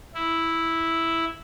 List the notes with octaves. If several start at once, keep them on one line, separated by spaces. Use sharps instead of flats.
E4